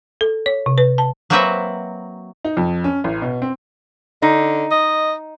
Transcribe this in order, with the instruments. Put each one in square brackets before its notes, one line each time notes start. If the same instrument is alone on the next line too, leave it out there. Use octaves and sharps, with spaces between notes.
[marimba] A4
C#5
C3
B4
A5
[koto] F#3 A#3 C4 F#4 B4 E5
[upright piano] D#4
F2
C#4
A1
B2
C4
[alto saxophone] D3 [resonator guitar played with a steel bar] D#4
[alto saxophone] D#5